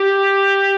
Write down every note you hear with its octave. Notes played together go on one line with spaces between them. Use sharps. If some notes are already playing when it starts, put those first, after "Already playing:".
Already playing: G4